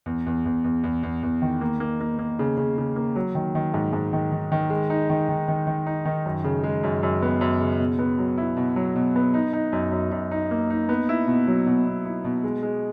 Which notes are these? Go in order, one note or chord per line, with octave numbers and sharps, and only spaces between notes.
E2
E2
E2
E2
E2
E2
E2
D#3
A#3
A#3
A#3
A#3
C#3
C#3
C#3
A#3
F#3
D#3
D#3
G#2
G#2
D#3
D#3
D#3
G#3
D#4
D#3
D#3
D#3
D#3
D#4
D#3
F#2
C#3
G#3
F#2
F#2
B3
F#2
C#3
B2
B3
F#3
E4
B2
F#3
B2
B3
D#4
D#4
F#2
F#2
F#2
D#4
A#3
D#4
B3
E4
B2
F#3
B2
B2
E4
B2
G#3
G#3